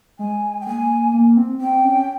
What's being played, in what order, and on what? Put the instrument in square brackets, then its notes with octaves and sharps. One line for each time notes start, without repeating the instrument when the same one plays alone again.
[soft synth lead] G#3 [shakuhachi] G#5
[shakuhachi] G5
[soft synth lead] A#3 [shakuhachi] G#5
[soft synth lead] A#3
C4
[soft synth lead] C4 [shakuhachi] G5
[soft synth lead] C#4